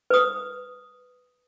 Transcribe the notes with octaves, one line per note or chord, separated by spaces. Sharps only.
B4 D#6